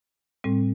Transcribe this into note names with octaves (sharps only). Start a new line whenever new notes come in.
A2 G3 C4